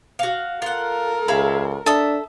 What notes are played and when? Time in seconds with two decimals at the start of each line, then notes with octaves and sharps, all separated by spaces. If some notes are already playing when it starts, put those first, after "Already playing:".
0.19 F#4 F5
0.62 F4 A4 A#4 F#5
1.28 C#2 G#4 E5 F5 B5
1.86 D4 A4 E5 D#6